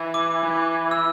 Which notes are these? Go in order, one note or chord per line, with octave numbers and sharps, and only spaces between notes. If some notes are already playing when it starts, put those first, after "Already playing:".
Already playing: E3
D6
E3
E6